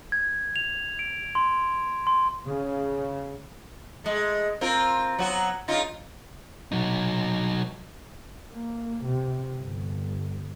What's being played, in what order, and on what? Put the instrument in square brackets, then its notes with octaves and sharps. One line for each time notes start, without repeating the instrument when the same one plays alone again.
[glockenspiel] G#6
F7
D7
C6
C6
[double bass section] C#3
[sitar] G#3 A3
C4 F4 A#4
F#3 B3 F#4
C#3 D#4 F4
[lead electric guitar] F#3 D#4
[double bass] A#3
C3
G1